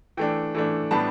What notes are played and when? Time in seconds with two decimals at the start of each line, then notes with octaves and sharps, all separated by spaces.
0.17 E3 A3 D4 G5
0.55 E3 A3 D4
0.91 A2 G3 B3 D4 A5